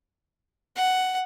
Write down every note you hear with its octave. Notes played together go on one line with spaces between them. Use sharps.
F#5